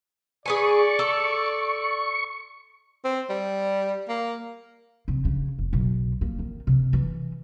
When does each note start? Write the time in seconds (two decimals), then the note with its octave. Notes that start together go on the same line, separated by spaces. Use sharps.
0.46 G#4 B4 D5 G#5 C#6
0.99 A4
3.05 C4
3.30 G3
4.09 A#3
5.08 C3
5.25 C#3
5.58 F1
5.73 B1
6.21 A#3
6.39 D#3
6.67 C3
6.93 E3